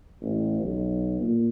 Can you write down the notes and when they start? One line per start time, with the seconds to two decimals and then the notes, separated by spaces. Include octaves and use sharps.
0.21 A1
0.62 B1
1.21 A#2